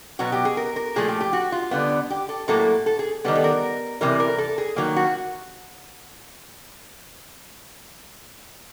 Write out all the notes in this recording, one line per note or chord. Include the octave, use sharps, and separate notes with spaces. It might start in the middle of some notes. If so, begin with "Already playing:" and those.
B2 F#3 B3 F#4
G4
G#4
A#4
A#4
A#2 F3 A3 G#4
G4
G4
F#4
F4
D3 G3 B3
G4
A4
A2 F#3 A#3 A4
A4
G#4
D#3 G3 B3 A4
A4
A#4
C3 E3 G3 A#4
A#4
A4
G#4
D#3 F#3 A#3
F#4